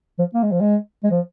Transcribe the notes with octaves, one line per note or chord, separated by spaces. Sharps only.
F3
A#3
G#3
F3
G#3
G#3
F3